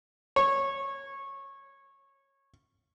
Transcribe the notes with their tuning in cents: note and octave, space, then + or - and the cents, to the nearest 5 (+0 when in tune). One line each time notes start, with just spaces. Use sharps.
C#5 -15